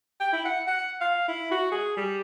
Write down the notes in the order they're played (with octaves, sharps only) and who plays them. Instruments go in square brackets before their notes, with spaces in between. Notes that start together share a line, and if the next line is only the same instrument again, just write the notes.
[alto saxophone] G5
E4
F#5
F#5
F5
E4
F#4
G#4
G3